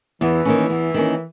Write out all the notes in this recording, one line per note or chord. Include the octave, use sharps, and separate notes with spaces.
E2 E3
D#3 A#3 C#4
E2
D#3 A#3 C#4